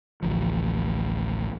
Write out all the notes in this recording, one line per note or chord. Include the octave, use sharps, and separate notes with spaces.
A1 D2 F3